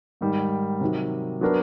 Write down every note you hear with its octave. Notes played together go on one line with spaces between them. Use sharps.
G#2 D#3 G3
C3 D#3 F#3
F#3 B3 D4 F#4 A#4